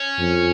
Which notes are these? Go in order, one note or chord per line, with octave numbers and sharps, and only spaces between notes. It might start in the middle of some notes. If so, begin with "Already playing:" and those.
Already playing: C#4
F2